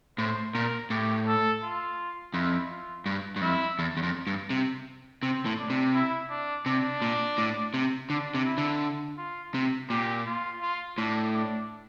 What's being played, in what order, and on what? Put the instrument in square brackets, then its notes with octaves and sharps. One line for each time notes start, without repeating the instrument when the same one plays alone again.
[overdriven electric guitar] A2 [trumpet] C5
[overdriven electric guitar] A#2 [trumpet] A#4
[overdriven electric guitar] A2 [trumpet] G4
[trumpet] A4
F4
[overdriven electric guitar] F2 [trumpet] E4
[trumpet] F4
[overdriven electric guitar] G2
G2
[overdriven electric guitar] F2 [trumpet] E4
[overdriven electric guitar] E2
E2
F2
G2
C3
[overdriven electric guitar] C3 [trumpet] C4
[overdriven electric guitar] A2
[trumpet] D4
[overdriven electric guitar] C3
[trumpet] E4
D4
[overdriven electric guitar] C3 [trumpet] D4
[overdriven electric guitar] A#2
A2
C3
[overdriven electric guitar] D3 [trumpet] D4
[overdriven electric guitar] C3
[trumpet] E4
[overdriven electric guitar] D3
[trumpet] F4
[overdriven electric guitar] C3
[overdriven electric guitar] A#2 [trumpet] G4
[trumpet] F4
F4
[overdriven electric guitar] A2 [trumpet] D4
[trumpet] D4